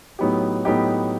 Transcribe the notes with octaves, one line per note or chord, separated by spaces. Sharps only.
A2 F#3 B3 D#4 G4
A2 F#3 B3 D#4 G4